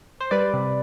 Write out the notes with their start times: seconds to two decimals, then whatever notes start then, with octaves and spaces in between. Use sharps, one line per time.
0.20 C5
0.31 G3 B4 D5
0.53 C3